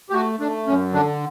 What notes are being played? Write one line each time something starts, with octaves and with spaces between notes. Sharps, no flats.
G4
A3 F#4
A3 D4
F#2 C#4
D3 D4